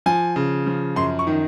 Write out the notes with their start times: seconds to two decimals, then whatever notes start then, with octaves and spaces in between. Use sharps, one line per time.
0.06 F3 G#5
0.36 C#3
0.66 F3
0.96 F#2 C6
1.19 C#6
1.27 D#3